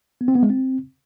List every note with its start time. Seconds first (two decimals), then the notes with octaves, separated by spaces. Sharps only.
0.21 B3
0.28 C4
0.35 B3
0.43 G#3
0.50 C4